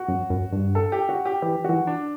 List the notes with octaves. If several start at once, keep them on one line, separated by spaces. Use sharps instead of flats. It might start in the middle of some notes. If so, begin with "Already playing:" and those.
Already playing: F#4
F#2
F#2
G2
A4
G4
F#4
G4
E3 G4
E3 F#4
D4